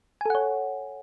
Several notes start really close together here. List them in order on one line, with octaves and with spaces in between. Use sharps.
G#5 A4 F#5 C#5